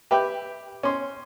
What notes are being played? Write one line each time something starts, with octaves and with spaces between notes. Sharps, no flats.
G4 B4 E5 G5
C#4 C6